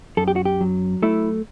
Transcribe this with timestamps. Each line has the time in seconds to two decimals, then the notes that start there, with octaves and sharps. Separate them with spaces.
0.17 F#2 A4
0.28 G4
0.36 F#4
0.45 G4
0.61 F#3
1.03 A3 E4